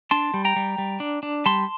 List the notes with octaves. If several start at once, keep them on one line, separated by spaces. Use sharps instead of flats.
D4 A5 C6
G3
G5 A#5
G3
G3
D4
D4
G3 A5 C6